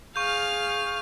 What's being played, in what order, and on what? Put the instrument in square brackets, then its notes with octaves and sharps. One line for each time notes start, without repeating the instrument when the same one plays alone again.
[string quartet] G#4 F5 F6 [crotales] C#6 G6